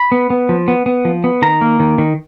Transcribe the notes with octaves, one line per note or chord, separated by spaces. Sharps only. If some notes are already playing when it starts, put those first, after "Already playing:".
Already playing: B5
B3
B3
F3
B3
B3
F3
B3
D#3 A#5
A#3
D#3
D#3